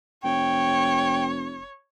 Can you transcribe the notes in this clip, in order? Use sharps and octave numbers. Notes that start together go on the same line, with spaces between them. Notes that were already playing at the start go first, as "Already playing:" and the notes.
F1 C#5 G5